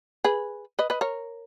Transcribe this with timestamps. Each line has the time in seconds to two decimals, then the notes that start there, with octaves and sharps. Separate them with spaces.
0.24 G#4 B4
0.79 B4 D#5
0.90 B4 D#5
1.01 A#4 C#5